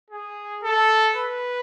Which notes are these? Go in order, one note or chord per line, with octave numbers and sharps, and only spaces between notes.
G#4
A4
B4